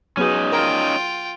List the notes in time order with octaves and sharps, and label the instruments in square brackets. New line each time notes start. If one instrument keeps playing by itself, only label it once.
[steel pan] F#3 B3 G#4 [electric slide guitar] C#4 D#4
[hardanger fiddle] F4 G5 [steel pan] A#4